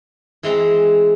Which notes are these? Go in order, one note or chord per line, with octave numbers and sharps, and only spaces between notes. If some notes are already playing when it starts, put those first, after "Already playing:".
E3 G#3 C4 A#5